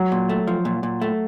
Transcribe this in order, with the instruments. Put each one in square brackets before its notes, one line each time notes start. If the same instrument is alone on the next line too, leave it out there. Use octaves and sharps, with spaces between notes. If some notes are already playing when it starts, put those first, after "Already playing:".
Already playing: [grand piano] F#3
[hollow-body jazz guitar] A#2
A3
F3
A#2
A#2
A3